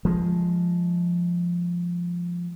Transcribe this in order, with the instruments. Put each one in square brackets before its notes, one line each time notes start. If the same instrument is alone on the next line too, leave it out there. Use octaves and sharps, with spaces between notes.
[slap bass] F3 G#3